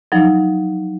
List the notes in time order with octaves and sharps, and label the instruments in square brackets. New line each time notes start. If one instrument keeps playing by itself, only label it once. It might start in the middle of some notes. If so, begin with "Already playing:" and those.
[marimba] F3 F#3 D#4